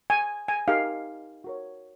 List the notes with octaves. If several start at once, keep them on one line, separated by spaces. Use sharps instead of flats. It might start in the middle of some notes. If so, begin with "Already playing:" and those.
G#5
G#5
D#4 G4 A#4 F5
F#4 A#4 C#5